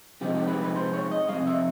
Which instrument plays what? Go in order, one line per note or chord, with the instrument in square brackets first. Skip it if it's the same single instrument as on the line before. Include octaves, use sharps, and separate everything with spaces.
[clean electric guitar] C3 F3 G#3 C4 D#4 G4
G4
B4
B4
C5
C#5
D#5
F2 C3 D#3 G#3 F5
E5